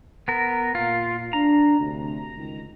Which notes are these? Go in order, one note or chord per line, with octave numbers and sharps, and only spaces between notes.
B3 A#4
A#2 F4
D4 A#5
D2 C3
C#2 D#3